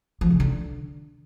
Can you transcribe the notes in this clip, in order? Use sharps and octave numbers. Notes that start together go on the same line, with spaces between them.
F3
C3
D3